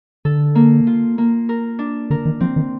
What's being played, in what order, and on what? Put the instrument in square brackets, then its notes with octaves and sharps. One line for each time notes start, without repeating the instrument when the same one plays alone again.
[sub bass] D3 [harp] A4
[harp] A#3
F4
A#3
A#4
D4
[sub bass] D3 [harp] A#4
[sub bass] D#3
[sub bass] F3 [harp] C4
[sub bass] D#3